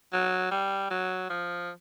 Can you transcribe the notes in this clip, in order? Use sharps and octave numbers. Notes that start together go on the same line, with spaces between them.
F#3
G3
F#3
F3